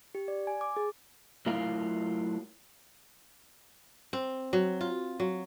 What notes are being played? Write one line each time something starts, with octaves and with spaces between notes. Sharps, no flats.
G4
D5
G#5
D6
G#4
F#3 A3 E4 F4 A#4 F5
C4
F#3
F4
F#3